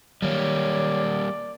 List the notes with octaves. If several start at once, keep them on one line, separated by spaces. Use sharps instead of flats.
D#3 F#3 G3 A#3 C#5 D5